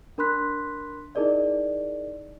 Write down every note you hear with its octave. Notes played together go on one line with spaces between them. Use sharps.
D4 A#4 B5 C6 F#6 B6
D#4 E4 G#4 A#4 D5 D#5